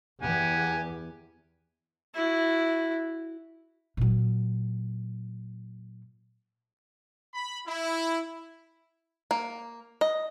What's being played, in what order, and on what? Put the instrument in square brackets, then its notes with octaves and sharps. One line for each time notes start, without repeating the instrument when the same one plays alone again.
[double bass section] E2 [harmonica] G4 F#5 G#5
[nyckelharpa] E4 F#4
[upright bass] A#2 F#3
[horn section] B5
E4
[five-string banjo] A#3
D#5